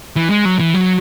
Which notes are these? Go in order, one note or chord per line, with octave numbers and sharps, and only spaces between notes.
E3
G#3
F#3
E3
F#3